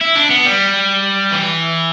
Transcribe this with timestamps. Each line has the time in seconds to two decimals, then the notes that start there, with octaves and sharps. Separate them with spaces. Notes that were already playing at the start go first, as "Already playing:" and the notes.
0.01 E4
0.16 D4
0.30 B3
0.45 G3
1.32 E3